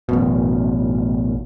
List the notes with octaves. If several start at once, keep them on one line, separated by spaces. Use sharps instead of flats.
A1 F#2 B2